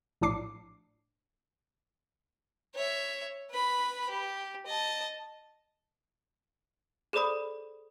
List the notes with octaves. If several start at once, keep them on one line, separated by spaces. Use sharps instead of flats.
A#1 A2 D4 D6 C7
C#5 E5
B4 B5
G4
D#5 A5
G#4 A4 C5 D5 B5 D#6